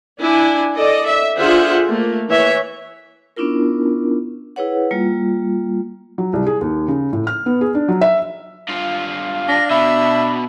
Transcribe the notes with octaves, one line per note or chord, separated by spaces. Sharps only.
D4 E4 G#5
A4 D5 D#5
E5
D3 F4 G#4 C5 E5 F#5
A3 A#3
E3 C#5 E5
B3 C#4 D4 E4 F4 A#4
E4 G#4 B4 C#5 F#5
G3 A#3 F4
F#3
C2
G#4
D#2
C#3
A2
F6
B3
G#4
D4
F#3
E5
G2 F4 F5
D4 A#6
B2 E5 B5